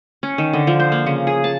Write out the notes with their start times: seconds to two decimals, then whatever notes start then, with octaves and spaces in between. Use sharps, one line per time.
0.23 C#4
0.38 D#3
0.53 D3
0.67 F3
0.80 C5
0.92 A#3
1.06 C#3
1.27 G#4
1.44 A5